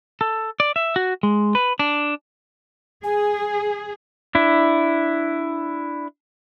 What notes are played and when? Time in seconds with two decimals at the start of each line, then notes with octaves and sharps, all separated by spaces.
0.21 A4
0.60 D5
0.76 E5
0.96 F#4
1.23 G#3
1.55 B4
1.79 D4
3.04 G#4 G#5
4.35 D4 E4